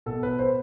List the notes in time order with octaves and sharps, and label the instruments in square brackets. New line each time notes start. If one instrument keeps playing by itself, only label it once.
[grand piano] B2 A4
B4
C5